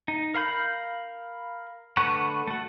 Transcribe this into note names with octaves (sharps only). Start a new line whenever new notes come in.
D#4
A#4 F5 B5 G6
D3 A3 B4 F#5 C#6
A3 F#4